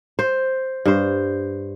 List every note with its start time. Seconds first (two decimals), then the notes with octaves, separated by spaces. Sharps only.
0.19 C5
0.85 G2 C5